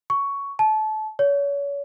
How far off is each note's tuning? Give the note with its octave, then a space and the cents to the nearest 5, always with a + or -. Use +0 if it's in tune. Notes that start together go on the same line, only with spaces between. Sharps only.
C#6 +10
A5 -25
C#5 +35